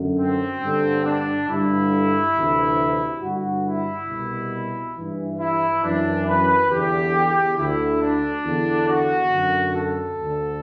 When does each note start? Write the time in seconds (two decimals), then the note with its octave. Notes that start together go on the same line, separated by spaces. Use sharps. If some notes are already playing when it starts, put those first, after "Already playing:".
Already playing: F#2 D3
0.17 C4
0.61 G2 D3
1.04 D4
1.48 G2 D3 E4
2.35 D2 C3 E3
3.22 G2 D3 F#4
3.65 E4
4.09 C2 B2
4.96 G2 E3
5.40 E4
5.83 F#2 E3 D4
6.27 B4
6.71 E2 D3 G4
7.57 D2 D3 E4
8.01 D4
8.45 E2 D3
8.88 F#4
9.32 F#2 D3
9.76 A4
10.19 D2 D3